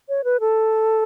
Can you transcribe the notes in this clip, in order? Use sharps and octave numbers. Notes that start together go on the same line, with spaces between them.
C#5
B4
A4